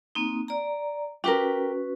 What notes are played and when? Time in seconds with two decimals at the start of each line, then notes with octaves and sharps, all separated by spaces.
0.15 A#3 C4 D#4
0.48 D5 A#5
1.24 C#4 F#4 G4 A#4 B4